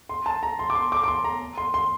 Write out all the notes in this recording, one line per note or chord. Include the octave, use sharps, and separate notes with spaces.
C6
A5
A#5
C6
D6
C6
D6
D6
C6
A#5
C6
C6